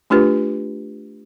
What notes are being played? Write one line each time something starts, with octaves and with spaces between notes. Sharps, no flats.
A3 D4 F4 G4 B4